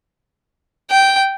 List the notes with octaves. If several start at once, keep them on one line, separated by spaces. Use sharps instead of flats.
G5